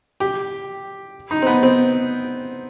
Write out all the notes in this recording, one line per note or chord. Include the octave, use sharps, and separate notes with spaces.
G4
D#4
C4
B3
C4